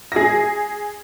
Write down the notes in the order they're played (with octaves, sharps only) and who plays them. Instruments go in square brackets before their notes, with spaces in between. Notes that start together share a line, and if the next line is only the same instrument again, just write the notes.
[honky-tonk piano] G#4 A#6